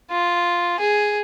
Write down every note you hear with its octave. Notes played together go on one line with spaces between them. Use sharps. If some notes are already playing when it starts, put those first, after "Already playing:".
F4
G#4